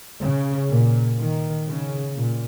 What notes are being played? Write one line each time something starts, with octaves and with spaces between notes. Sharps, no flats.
C#3
A#2
D#3
C#3
A#2